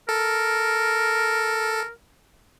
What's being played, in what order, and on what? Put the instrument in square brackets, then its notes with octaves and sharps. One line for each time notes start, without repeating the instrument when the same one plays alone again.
[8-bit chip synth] A4 [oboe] A#4